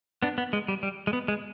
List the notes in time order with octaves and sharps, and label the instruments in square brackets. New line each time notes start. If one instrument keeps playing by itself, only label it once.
[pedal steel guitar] B3 D4
B3
G#3
G3
G3
G#3
B3
G#3